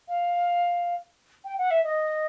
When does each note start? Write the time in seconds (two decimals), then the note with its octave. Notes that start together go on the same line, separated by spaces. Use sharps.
0.08 F5
1.45 G5
1.58 F#5
1.71 E5
1.84 D#5